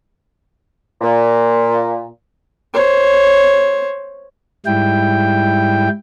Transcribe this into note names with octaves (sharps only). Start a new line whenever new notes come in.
A#2
C5 C#5
G#2 G3 E4 G5